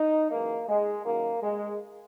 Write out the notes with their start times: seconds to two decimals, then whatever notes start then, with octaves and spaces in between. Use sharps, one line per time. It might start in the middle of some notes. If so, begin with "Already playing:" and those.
Already playing: D#4
0.31 F#2 E3 G#3 A#3
0.68 G#3
1.05 F#2 D#3 F#3 A#3
1.42 G#3